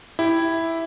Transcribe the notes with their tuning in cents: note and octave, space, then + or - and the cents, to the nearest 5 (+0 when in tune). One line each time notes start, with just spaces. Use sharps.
E4 +0 G4 +0